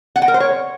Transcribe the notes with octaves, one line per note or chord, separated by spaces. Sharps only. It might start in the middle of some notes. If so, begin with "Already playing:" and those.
F#5
G5
A#4
C5
C#5